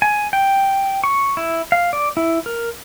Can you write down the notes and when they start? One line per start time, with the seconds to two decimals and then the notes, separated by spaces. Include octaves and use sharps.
0.02 G#5
0.33 G5
1.04 C#6
1.37 E4
1.72 F5
1.93 D5
2.17 E4
2.46 A#4